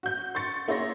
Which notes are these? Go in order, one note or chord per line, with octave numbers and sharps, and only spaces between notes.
F#4 G6
C6 C#6 A6 C#7
A#3 E4 G#4 C#5 C6 A#6